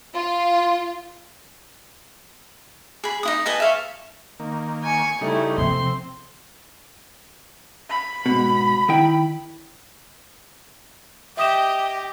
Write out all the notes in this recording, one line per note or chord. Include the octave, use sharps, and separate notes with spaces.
F4
G#4 B5
D#4 E4 D#6
B4 D#5 G#5 A5
E5 F5 C#6
D#3 A#3
G#5 C#6
C#3 G3 A3 D#4 E4
C3 F3 C4 C6
B5
G#2 B2
D#3 E4 G5 B5
G4 D#5 E5 G5 D#6 E7